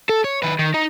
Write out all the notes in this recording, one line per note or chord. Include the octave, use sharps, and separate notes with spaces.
A4
C#5
D#3 B4
D#3
D#4